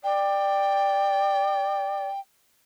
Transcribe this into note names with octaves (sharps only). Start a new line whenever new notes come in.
D5 G5